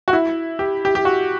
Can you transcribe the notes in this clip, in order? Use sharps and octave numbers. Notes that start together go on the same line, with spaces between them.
F#4
E4
G4
G4
G4
F#4